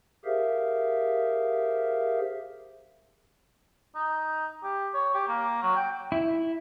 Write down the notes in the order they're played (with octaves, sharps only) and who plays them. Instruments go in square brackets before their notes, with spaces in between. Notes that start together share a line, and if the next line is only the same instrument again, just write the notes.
[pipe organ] G4 G#4 A#4 C5 E5 F5
[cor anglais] D#4
G4
C#5
G4
A#3
F#3
G5
[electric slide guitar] E4